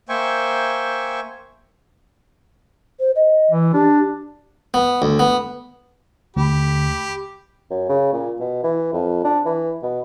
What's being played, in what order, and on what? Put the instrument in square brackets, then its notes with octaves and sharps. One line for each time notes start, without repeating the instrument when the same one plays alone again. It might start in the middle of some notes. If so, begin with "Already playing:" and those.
[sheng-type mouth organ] A#3 C5 E5 G5 G#5 C#6
[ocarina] C5
D#5
[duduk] E3
[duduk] D4 [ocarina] G4
[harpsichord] B3
D2
B3
[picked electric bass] D#2 D3 A3 [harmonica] G4 B5
[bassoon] F#2
C#3
A#2
B2
E3
F2
D4
E3
B2